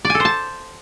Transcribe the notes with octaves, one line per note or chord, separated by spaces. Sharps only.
D5
G#5
A4
C5
A5